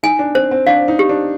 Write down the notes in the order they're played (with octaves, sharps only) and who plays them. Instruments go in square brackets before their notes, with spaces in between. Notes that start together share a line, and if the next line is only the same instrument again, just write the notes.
[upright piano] D#4 [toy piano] G#5
[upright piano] D4
[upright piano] C4 [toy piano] C5
[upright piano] C4
[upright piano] D4 [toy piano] F5
[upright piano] D#4
[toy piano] G4
[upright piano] D4